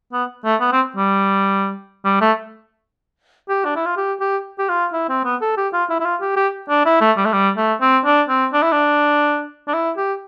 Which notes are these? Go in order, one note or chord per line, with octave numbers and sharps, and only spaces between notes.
B3
A3
B3
C4
G3
G3
A3
G4
D4
E4
F4
G4
G4
G4
F4
E4
C4
B3
A4
G4
F4
E4
E4
F4
G4
G4
D4
E4
A3
G3
A3
G3
A3
C4
D4
C4
D4
E4
D4
D4
E4
G4